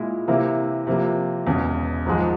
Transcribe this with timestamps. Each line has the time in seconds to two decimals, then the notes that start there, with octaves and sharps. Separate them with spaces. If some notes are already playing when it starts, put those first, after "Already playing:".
Already playing: A#2 G#3 E4
0.28 C3 E3 A#3 E4
0.87 C3 F3 A#3
1.46 E1 E2 C#3
2.05 G#1 G#2 F3 G#3